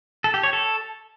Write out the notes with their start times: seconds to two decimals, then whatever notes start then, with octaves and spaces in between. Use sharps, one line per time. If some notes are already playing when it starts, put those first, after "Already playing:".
0.24 A4
0.34 G4
0.43 C#5
0.53 A4